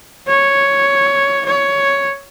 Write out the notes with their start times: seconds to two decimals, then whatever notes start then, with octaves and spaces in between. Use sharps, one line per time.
0.28 C#5
1.46 C#5